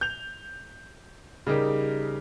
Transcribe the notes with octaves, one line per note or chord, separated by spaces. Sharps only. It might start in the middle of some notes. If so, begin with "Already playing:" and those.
G6 F7
C#3 G3 D#4 G4 A#4